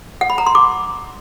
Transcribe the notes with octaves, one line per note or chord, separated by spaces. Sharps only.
F#5
B5
A#5
C6
D6